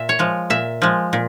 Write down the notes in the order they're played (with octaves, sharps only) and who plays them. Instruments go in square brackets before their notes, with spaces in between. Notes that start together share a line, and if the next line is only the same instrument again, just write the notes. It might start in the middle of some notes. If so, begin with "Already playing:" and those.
Already playing: [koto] A#2 E5
C#5
F3 G#3
A#2 E5
F3 G#3
A#2